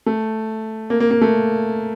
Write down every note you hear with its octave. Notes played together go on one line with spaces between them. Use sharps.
A3
A#3
A#3
A#3
A3